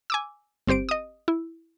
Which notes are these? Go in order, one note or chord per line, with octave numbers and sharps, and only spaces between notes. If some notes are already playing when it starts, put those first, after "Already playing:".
G#5 D6 E6
G1 C4 G4 C5 D7
D#5 D#6
E4